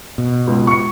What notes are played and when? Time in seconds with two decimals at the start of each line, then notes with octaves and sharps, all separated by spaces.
0.18 B2
0.47 C#2
0.67 C#6 C#7